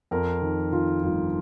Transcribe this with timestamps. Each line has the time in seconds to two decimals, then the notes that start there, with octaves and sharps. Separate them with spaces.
0.11 F2 A#4
0.42 D#3
0.72 D#3 F4
1.03 G1 F4